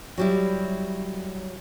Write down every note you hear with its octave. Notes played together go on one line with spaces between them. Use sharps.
F#3 G3 E4